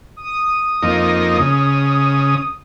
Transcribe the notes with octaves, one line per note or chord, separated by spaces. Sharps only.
D#6
F2 A#3 D#4
C#3